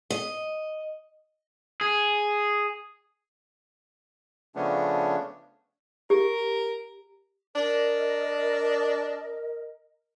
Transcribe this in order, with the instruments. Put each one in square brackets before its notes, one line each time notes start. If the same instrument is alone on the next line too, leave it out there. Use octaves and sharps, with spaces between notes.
[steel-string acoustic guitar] D#5
[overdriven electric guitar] G#4
[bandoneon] C#3 F3 A3 B3 C#4 D4
[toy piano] G4 [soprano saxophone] A#4
[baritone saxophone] D4 [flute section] A#4 D#5